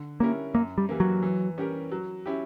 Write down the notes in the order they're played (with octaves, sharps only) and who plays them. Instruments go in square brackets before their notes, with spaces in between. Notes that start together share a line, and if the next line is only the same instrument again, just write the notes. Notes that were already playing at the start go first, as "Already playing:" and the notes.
Already playing: [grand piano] D3
[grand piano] G3 C#4 E4 A#4 [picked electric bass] A#3
[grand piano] F#2 [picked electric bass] A#3
[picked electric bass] G3
[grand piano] E3 G3 A#3
[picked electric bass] F#3
[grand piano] E3
G3 C#4 G4 A#4
F#3
C#4 E4 G4